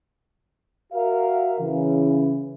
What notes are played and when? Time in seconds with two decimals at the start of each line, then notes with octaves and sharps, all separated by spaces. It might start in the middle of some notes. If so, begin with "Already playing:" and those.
0.93 F#4 A#4 E5 F5
1.59 C#3 E3